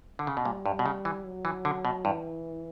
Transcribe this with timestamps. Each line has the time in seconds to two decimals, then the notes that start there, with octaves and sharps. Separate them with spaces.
0.19 D3
0.27 C#3
0.37 B2
0.45 A#2 G3
0.66 G2
0.79 B2
0.86 C#3
1.05 E3
1.25 F#3
1.45 E3
1.65 D3
1.85 B2
2.05 G2 E3